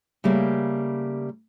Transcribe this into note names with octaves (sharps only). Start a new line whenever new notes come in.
C#3 G3 A3 A#3